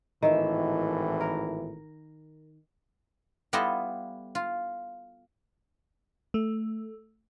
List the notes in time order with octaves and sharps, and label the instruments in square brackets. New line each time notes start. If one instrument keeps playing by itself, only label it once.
[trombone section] G#1 A2 E3 [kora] D#3 E5
[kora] A#4
[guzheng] G3 B3 E4 F4 A4 D#5
F4
[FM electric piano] A3